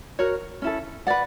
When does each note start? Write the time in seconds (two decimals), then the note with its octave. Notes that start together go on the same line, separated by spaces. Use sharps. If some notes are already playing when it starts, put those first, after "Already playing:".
0.19 F#4 A#4 C#5
0.62 C#4 E4 A4
1.07 B4 D5 F#5